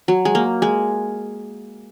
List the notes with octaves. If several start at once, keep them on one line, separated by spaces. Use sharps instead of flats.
F#3
G#3
A#3
G#3